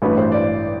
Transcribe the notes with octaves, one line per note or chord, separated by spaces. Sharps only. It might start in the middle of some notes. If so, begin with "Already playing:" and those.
A1 G2 F#3 B4
C5
D5